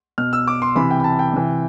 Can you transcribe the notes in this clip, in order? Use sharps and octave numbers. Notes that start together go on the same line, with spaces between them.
B2 F6
E6
D6
C6
C3 E3 B5
G5
B5
A5
G5
C3 E3